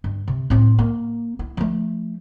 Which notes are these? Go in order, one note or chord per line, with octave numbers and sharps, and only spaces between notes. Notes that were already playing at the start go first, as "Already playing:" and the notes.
G2
C3
A2 C4
A#3
E4
F3 A3